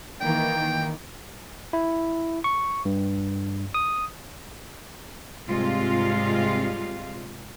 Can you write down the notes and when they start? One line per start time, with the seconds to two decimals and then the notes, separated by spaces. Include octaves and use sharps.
0.21 D#3 E3 A#3 G5
1.73 E4
2.44 C#6
2.85 G2
3.74 D#6
5.47 G#2 C3 G3 G#3 F4 F5